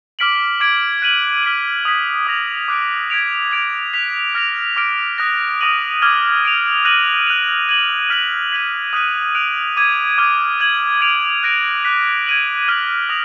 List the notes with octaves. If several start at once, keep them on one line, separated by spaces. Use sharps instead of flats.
D6 F6 B6 D7 F#7
D6 G#6 B6 D7
F#6 B6 D#7 F#7
F6 B6 D#7 F#7
D#6 G#6 B6
D#6 A#6 F7
D6 F#6 B6 D7
G#6 B6 D7 F7
G#6 D7 F7
F#6 B6 F7
F6 A#6 D7 F7
D6 F6 A#6 D7
D#6 F#6 A#6
D#6 A#6 D#7 F#7
D6 F6 G#6
F#6 D7 F7
F#6 A#6 D#7 F#7
F#6 D7 F7
G#6 D#7 F#7
F6 B6 D#7 F#7
G#6 B6 D#7 F#7
D#6 F#6 B6 D#7 F#7
F#6 D7 F7
D6 G#6 D#7
D6 F6 G#6 D7
G#6 D#7 F#7
G#6 D7 F7
F#6 A#6 D7 F7
D6 F#6 B6
G#6 D#7 F#7
F6 G#6 B6 D#7 F#7
D#6 A#6 F7